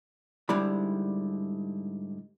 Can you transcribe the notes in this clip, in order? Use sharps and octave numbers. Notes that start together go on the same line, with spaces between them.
G#2 D3 G3 E4 D5 B5